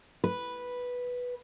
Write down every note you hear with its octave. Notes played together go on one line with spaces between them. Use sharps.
B4